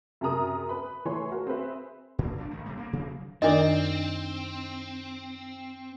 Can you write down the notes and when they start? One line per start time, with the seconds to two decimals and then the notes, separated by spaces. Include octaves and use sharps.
0.21 F#2 C3 G#4 A#4 A#5 D#6
0.69 B4 B5
1.05 E3 A3 C#5 G#5 C6
1.31 F#4 A#4
1.47 C4 G#4 B4 E5
2.19 A#2 D3
2.38 G1 F3 D4
2.51 G#1 A3
2.66 C3 G3 A3 A#3
2.77 G2 A#3 B3 C#4
2.93 C3 F#3 A#3 B3
3.42 F#2 D#3 C4 D4 D#4 A#4 D5 D#5